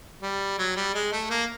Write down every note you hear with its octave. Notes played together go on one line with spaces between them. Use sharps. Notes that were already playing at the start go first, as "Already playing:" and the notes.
G3
F#3
G3
G#3
A3
A#3